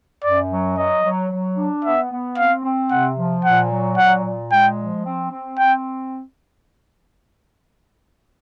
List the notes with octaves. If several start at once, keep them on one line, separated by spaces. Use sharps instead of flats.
F#2 D5
F#3
F#3 D#5
F#3
F#3
D4
B3 E5
B3
C4 F5
C4
C3 F#5
F3
A#2 F#5
F#3
A#2 F#5
A#2
G#3 G5
F3
C4
C4
C4 G5